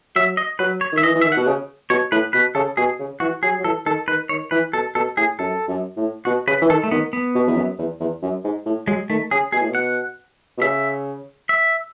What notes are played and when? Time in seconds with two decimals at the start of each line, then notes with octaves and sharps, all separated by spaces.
0.15 F#3 E5
0.37 D#5
0.59 F#3 B4
0.81 C#5
0.92 D#3
0.98 E5
1.03 E3 D#5
1.15 E3
1.21 D#3 E5
1.32 F#5
1.37 B2
1.47 C#3
1.90 B2 C#5
2.11 A2 B4
2.33 B2 B4
2.55 C#3 A4
2.77 B2 G#4
2.99 C#3
3.20 E3 F#4
3.43 F#3 G#4
3.59 F#3
3.64 E3 A4
3.86 D#3 A4
4.08 D#3 B4
4.29 D#3 C#5
4.51 E3 B4
4.73 B2 A4
4.95 B2 A4
5.17 A2 G#4
5.39 F#2 A4
5.68 F#2
5.97 A2
6.25 B2 F#4
6.47 C#3 B4
6.61 E3
6.69 D#3 A4
6.84 A3
6.91 D#3 B3
7.13 B3
7.35 B2
7.47 E2
7.56 F#2
7.78 E2
8.00 E2
8.22 F#2
8.44 G#2
8.65 A2
8.87 F#3 G#3
9.09 D#3 A3
9.31 C#3 G#4
9.52 B2 G#4
9.61 A2
9.69 B2
9.75 F#5
10.57 B2
10.61 C#3 E5
11.49 E5